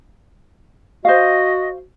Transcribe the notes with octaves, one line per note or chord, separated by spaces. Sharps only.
F#4 C5 D#5 F5